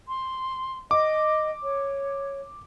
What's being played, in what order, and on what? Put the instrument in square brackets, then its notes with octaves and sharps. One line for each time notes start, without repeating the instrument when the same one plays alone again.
[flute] C6
[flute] D#5 [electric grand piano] D6
[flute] C#5